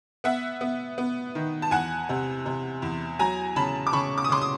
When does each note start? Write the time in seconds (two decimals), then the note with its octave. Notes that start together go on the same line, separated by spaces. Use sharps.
0.24 B3 E5 F#5
0.61 B3
0.98 B3
1.35 D#3
1.62 A5
1.71 E2 F#5 G#5
2.09 C3
2.46 C3
2.82 E2
3.19 F#3 G#5 A#5
3.56 C#3 A5 B5
3.87 D6
3.93 C#3 B5 C#6
4.18 D6
4.24 D#6
4.29 C#3 C6 D6
4.42 D#6